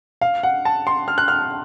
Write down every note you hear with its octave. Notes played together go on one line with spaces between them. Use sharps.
F5
F#5
A5
C6
F6
F#6
F6